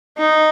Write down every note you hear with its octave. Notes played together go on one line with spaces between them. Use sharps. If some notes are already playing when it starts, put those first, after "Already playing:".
D#4